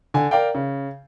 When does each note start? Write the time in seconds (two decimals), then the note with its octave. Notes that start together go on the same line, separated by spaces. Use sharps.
0.14 D3 G#5
0.31 A#4 D5 F5 G5
0.55 C#3